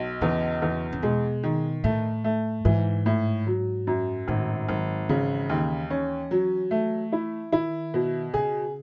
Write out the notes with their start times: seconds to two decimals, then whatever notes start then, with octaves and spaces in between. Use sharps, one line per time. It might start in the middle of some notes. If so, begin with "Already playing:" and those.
Already playing: B1
0.21 E2 C#3
0.62 E2
0.93 C#3
1.03 B2 G#3
1.43 D#3
1.84 A2 A3
2.24 A3
2.65 G#2 E3
3.06 A2
3.47 F#3
3.87 F#2
4.28 G#1 A2
4.68 G#1 F#3
5.09 C#3 E3
5.49 D#2
5.90 C#4
6.31 F#3
6.71 A3
7.12 E4
7.52 D#3 E4
7.94 B2
8.34 C#3 G#4